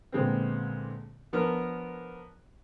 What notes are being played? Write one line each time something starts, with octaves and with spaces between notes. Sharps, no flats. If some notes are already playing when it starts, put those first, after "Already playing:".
A#2 D3 G#3 B3 C4
F3 B3 D4 A#4